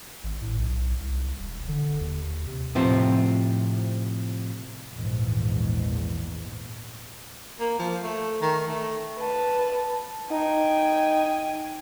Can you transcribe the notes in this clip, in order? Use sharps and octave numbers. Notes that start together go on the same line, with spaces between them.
G#1
A2
B1
C2
E1
D3
D#2
C3
A2 C3 F3 C4
A#1 E2 G#2
A#3
F3
A3
D#3
A3
B4 A5
D#4 G5 G#5